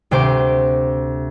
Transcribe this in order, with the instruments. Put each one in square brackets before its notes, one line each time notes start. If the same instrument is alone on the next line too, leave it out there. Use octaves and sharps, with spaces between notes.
[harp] D2 C3 C5 D6